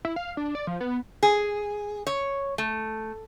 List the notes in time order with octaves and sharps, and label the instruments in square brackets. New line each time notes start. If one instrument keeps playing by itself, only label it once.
[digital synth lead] E4
F5
D4
D5
F3
B3
[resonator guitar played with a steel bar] G#4
C#5
A3